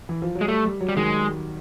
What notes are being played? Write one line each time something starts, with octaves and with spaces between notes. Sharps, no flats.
E3
F3
F#3
G#3
G3 A3
G3
F#3
G3
D#3 G#3